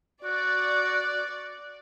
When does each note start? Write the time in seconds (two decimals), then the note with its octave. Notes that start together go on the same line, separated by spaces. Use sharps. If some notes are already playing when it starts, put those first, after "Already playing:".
0.24 F#4 D5